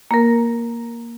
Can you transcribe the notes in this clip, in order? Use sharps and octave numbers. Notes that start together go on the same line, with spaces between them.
A#3 A#4